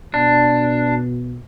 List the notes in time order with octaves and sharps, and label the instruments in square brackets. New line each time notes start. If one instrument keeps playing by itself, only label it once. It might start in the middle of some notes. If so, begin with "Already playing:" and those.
[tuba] B2 [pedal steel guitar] D4